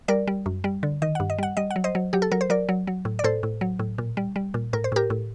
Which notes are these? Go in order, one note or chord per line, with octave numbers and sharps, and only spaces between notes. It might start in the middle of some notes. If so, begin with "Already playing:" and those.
G3 A#4 D5
G3
F#2
G3
D3
D#3 D#5
G2 F#5
D#5
G3 F#5
G3 D#5
F#5
F#3
C5 D#5
F#3
F#3 G4
A4
F#3 A#4
C5
F#3 A#4 D5
F#3
F#3
A2
D5
A2 A4 C5
A2
F#3
A2
A#2
G3
G3
A#2
A2 A#4
C5
A2 G4 A#4
A2